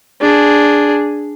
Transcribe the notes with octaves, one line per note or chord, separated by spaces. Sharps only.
D4 G#4